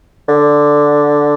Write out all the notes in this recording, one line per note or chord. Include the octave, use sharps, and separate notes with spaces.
D3